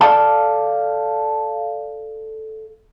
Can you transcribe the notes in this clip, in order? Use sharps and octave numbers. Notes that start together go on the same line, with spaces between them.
A4 D5 F5 A5